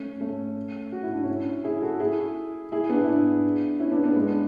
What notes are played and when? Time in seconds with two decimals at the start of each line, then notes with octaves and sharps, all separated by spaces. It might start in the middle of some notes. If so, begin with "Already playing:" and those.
Already playing: A3 C#4
0.21 A3 C#4
0.92 F#4
1.03 E4
1.14 D4
1.23 C#4 E4
1.64 E4 G#4
1.82 F#4 A4
2.00 E4 G#4
2.72 E4 G#4
2.89 B3 D4
3.04 E4
3.08 B3 D4
3.80 C#4 E4
3.91 B3 D4
4.04 B3 D4
4.15 G#3 B3